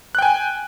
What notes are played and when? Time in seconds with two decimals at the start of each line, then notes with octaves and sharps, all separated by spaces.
0.15 F#6
0.19 G5
0.22 G#5